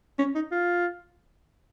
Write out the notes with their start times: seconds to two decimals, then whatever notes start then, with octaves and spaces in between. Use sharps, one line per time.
0.19 C#4
0.35 D#4
0.52 F4